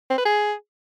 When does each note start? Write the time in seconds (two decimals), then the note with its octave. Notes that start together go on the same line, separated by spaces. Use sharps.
0.10 C4
0.18 B4
0.25 G#4